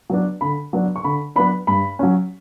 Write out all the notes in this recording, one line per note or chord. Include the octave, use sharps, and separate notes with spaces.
F#3 B3 D4
D3 B5
F#3 B3 D4
C#6
D3 B5
F#3 B3 D4 B5
G2 B5
F#3 C#4